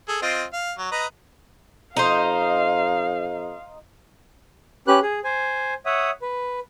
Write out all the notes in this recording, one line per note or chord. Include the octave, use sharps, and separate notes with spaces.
G#4 A4
C4 F4 D#5
F5
F#3
B4 D#5 A#5
F2 D#4 C5 F5
C#4 G4 B4 F#6
G#4
C5 G#5
C#5 E5 F#5 D#6
B4